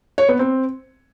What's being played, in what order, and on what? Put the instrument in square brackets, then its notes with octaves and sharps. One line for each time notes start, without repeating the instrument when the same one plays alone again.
[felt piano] C#5
B3
C4